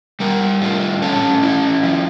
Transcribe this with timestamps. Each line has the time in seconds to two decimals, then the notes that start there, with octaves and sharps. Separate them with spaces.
0.20 G3 A#4
0.61 A2 F4
1.02 C#4 A4
1.42 E4
1.83 F3